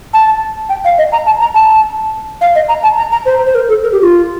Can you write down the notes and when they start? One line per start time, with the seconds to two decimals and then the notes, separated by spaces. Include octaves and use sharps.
0.14 A5
0.69 G5
0.85 F5
0.98 D#5
1.12 A#5
1.26 A5
1.41 A#5
1.55 A5
2.41 F5
2.56 D#5
2.69 A#5
2.83 A5
2.98 A#5
3.12 A#5
3.26 C5
3.47 C5
3.55 A#4
3.69 A4
3.83 A#4
3.92 G4
4.02 F4